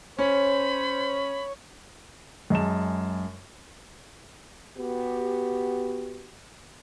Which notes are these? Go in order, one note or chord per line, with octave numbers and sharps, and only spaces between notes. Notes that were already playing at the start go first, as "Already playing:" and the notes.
C#4 C5 C#5 B5
F#2 G#3 A5 E7
B3 F#4 G4